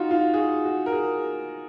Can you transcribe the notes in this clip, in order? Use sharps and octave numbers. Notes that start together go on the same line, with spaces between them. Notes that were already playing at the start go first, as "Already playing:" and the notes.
Already playing: D#4 F4 F#4
F4
G#4
F#4
F#4
A#4
G#4